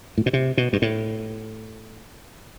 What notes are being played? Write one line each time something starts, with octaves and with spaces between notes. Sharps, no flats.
A2
B2
C3
B2
G2
A2